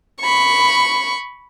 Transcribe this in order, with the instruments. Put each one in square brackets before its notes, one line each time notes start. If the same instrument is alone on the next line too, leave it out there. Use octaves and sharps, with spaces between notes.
[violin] B5 C#6